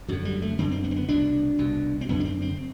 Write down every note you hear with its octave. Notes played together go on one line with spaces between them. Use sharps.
F#2 D3 F#3
G3
A3
F#2 D3 C4
C4
B3
C4
B3
C2 B2 D4
C2 B2
C4
F#2 D3 B3
D4
C4
C4